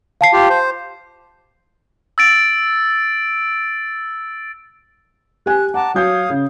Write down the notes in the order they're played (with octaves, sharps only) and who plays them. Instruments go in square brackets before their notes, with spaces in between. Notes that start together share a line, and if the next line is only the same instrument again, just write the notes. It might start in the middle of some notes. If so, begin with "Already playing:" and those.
[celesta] F5 A5 C7
[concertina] F4 G4
C5
[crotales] E6 A6 D7
[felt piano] G4 G#5 [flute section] F#6
[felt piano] F#5 [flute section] A5 A#5 D6
[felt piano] F#3 G6 [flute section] C#5 F5 D#6
[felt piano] C#3